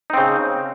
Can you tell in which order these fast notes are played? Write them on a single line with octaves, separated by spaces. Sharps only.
D#4 C4 C#3